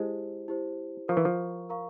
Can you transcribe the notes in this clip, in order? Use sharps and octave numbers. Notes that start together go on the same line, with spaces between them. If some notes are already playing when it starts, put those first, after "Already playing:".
Already playing: G#3 E4 G4 C5
E4 G4 C5
F3 A#4 F5 A#5 C#6
E3
F3
A#4 F5 A#5 C#6